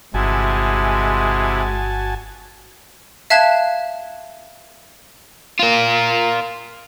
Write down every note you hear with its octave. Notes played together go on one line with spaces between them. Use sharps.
G1 C3 G#3 E4 F#4 G#5 A5
E5 F5 A5 F#6 G#6 E7
F4 A#4